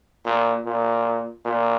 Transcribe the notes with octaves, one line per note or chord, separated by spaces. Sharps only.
A#2
A#2
A#2